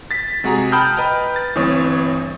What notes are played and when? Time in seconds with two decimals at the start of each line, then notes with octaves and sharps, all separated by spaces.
0.11 A6 B6
0.44 C3 G#3 F#4 G#4 A#5
0.72 G5 A5 B5 D#6 F6 G6
0.97 B4 D#5 G5 A#5
1.36 A6
1.55 G1 E3 A3 C4 C#5 D#6